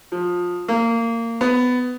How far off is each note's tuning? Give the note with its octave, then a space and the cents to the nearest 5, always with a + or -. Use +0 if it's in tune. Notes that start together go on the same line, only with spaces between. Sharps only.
F3 +20
A#3 -20
B3 +15